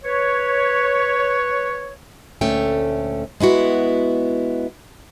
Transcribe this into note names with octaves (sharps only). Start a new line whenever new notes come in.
B4 C#5
D2 A#2 A3 C#4 G5
G#3 B3 E4 F#4